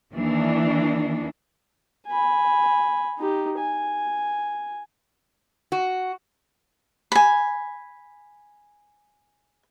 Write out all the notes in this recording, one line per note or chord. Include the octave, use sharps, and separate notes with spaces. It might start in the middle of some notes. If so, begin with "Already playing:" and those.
D#2 D#3 E3 D4
G#5 B5
D#4 G4
G#5
F#4
G#5 B5